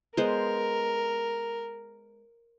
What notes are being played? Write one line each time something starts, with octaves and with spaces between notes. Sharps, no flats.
G#3 B3 A#4 C5